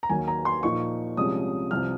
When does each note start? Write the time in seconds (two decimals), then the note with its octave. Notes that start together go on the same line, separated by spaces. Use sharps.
0.03 A#5
0.09 D#2 D#3 F#3 A#3 G#5
0.28 A#5
0.45 C6
0.63 A#2 F3 A#3 D#4 C#6
1.17 C2 C3 F3 G#3 C#4 D#6
1.71 C2 C3 F3 F6